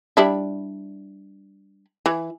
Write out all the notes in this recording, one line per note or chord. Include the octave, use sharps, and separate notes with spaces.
G3 D4 E4
E3